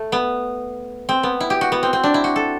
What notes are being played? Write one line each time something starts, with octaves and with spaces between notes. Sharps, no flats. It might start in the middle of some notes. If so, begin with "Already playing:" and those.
Already playing: A3
B3
C4
B3
E4
G4
F#4
B3
C4
C4
D4
E4
F#4
A4